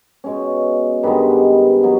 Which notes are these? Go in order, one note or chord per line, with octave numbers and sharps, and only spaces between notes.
B2 G#3 C#4
G2 D#3 G#3 B3 B4
F#3 B3